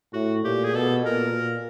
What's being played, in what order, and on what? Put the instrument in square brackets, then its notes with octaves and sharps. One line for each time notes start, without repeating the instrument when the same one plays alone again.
[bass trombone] A2 [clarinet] F#4
[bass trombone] A#2 [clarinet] G4
[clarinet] G#4
[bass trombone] B2 [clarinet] A4
[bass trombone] A#2 [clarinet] A#4